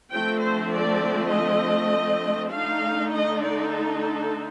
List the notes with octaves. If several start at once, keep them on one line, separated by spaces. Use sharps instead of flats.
D3 F3 A3 C4 G5
C5
D5
D#5
D3 A3 D#4 F5
D#5
D5
A4
A4